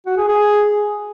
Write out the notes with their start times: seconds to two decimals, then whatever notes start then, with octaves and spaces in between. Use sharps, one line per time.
0.06 F#4
0.17 G#4
0.28 G#4